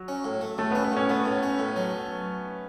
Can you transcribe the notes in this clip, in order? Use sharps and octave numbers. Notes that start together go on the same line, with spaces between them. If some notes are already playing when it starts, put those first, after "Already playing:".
Already playing: F#3
C#4
A2
A3
A2 A3
B3
C#4
B3
A2 C#4
A3 B3
A2
C#4
A2
F#3